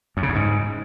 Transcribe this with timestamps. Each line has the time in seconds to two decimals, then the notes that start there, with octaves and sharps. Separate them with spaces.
0.17 F#2
0.23 C#3
0.29 F#2
0.35 G#2